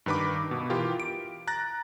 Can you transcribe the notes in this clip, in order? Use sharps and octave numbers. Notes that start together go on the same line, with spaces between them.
G2 D#3 B4 B5 D6
B2
E3 F4 G4 A#4
D7
A#5 F#6 A6 A#6